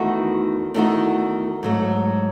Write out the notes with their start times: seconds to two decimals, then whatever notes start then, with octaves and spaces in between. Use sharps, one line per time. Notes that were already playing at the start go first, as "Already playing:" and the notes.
Already playing: E2 D#3 A3 D#4 F#4
0.74 E2 D#3 A3 D#4 F#4
1.63 G#2 F#3 A3